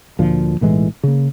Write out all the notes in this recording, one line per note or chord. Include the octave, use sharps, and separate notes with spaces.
D2 A#2 F3
B1 A2 E3 G#3
C#3 A#3